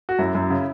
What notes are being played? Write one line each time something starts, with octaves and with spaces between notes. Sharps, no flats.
F#4
F#2 E4
F#2
C#3